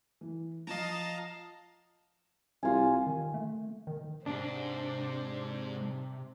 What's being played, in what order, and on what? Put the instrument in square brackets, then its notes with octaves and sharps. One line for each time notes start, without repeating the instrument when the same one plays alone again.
[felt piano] E3
[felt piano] F3 [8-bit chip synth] D#5 A#5 [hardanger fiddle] F5 A5
[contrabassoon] C2 [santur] F4 G#5
[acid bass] D#3
A3
D#3
[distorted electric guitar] G#2 [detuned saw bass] C3 [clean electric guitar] D4 [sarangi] C5